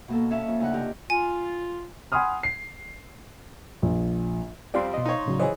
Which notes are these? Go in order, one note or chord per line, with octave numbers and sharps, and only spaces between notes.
B2 A#3 A4
C#4 C#5 E5 F5 A5
F2
D2 C#3 D#4 F#5
C3 G4 A#4
F4 G#5
F#5 G#5 B5 C6 D#6 F6
C7
A#1
F2 G3 C4 D5 F5 C6
B2 D#5
D#4 C#5
A2 C#3 F#3
E3 G#4 C5 C#5 D#5